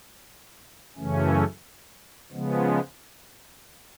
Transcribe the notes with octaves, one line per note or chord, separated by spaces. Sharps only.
F#2 C#3 E3 A3 C#4
C#3 F3 G#3 B3